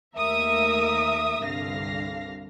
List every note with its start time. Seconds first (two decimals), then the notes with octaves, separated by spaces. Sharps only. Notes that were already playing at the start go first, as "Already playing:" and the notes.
0.15 D#2 A3 A#3 A#4 E5 D#6
1.43 C2 G2 D3 F5 A#6